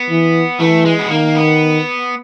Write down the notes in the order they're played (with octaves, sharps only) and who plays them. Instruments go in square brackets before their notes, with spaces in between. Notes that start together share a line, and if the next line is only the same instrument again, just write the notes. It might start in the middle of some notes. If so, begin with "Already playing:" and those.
Already playing: [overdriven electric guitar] B3
[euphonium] E3
[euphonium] E3 [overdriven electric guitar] A3
[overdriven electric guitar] G#3
B3
[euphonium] D#3 [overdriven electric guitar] A#3
[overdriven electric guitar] B3